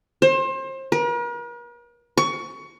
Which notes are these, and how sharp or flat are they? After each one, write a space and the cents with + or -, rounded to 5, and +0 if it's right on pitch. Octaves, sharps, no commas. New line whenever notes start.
C5 +30
A#4 +45
C#6 +20